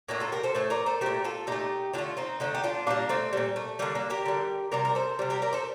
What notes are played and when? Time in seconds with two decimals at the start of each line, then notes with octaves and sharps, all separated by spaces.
0.08 A2 A3 A#3 D4
0.20 F4 A4
0.32 G4 A#4
0.43 A4 C5
0.55 A2 A3 A4 C5
0.70 A#4 D5
0.86 A4 C5
1.01 A#2 A3 G4 A#4
1.24 F4 A4
1.47 A#2 A3 D#4 G4
1.93 D3 A3 D4 F4
2.17 C4 D#4
2.40 D3 A3 C4 D#4
2.55 G4
2.63 D4 F4
2.87 A#2 G3 A#3 D4
3.09 A3 C4
3.33 A#2 G3
3.56 A3
3.79 D3 G3 A#3
3.95 A#3 D4
4.10 G4 A#4
4.26 D3 G3
4.72 C3 G3 A#4 D5
4.85 A#4
4.95 A4 C5
5.19 C3 G3
5.30 G4 A#4
5.42 A#4 D5
5.53 A4 C5